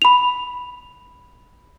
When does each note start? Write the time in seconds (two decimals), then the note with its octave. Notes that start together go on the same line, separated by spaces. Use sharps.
0.02 B5 F7